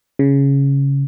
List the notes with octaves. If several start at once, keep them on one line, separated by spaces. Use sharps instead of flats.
C#3